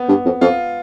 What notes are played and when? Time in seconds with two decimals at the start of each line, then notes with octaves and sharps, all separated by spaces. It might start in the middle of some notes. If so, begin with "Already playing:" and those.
Already playing: B3
0.09 G2
0.25 F2
0.41 F2 F4